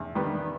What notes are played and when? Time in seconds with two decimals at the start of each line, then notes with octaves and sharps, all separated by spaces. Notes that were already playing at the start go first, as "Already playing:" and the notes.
Already playing: E2
0.15 D#3 G3 B3